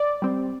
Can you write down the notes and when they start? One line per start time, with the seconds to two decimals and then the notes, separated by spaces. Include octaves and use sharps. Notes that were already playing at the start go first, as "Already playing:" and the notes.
Already playing: D5
0.22 G3 C4